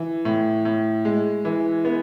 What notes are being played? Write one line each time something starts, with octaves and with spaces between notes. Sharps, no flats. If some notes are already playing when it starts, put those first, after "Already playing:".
Already playing: E3
A2
A2
G#3
E3
B3